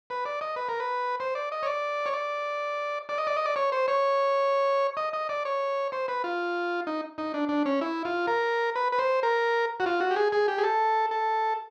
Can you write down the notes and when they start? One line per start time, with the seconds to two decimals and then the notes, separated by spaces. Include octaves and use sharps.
0.10 B4
0.25 D5
0.41 D#5
0.56 B4
0.69 A#4
0.80 B4
1.20 C5
1.35 D5
1.52 D#5
1.63 C#5
1.66 D5
2.06 C#5
2.14 D5
3.09 D5
3.18 D#5
3.27 D5
3.37 D#5
3.46 D5
3.56 C#5
3.72 C5
3.88 C#5
4.97 D#5
5.13 D#5
5.29 D5
5.45 C#5
5.92 C5
6.08 B4
6.24 F4
6.87 D#4
7.18 D#4
7.34 D4
7.49 D4
7.66 C#4
7.81 E4
8.05 F4
8.27 A#4
8.76 B4
8.92 B4
8.99 C5
9.23 A#4
9.80 F#4
9.86 F4
10.00 F#4
10.11 G4
10.16 G#4
10.32 G#4
10.48 G4
10.58 G#4
10.63 A4
11.11 A4